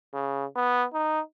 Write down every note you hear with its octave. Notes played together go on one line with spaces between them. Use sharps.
C#3
B3
D#4